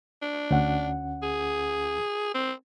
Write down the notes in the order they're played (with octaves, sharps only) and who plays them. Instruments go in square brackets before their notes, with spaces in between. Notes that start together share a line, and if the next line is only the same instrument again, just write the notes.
[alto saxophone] D4
[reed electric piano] D2 C#4 F#5
[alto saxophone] G#4
C4